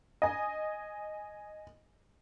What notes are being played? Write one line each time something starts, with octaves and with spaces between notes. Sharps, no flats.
D#5 G#5